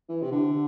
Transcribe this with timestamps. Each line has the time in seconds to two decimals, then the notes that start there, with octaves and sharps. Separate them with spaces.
0.09 E3
0.23 C3
0.32 D3